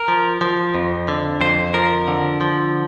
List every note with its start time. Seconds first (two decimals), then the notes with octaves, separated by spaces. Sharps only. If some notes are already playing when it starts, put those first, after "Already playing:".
Already playing: A#4
0.08 F3
0.41 F3
0.75 F2
1.08 D3
1.41 F2 C5
1.74 F3 A#4
2.08 D3
2.41 F3